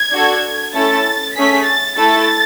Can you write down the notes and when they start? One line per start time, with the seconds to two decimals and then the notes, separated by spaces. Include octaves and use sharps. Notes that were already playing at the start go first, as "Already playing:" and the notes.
Already playing: G#6
0.12 D4 F#4 A4
0.74 A3 C#4 E4 A4 A6
1.35 A3 C#4 G#4 B6
1.66 A6
1.97 A3 E4 A4 A6